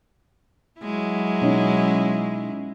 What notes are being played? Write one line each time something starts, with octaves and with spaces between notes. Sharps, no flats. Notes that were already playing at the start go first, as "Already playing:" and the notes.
F#3 G#3 E4
B2 C#4 D#4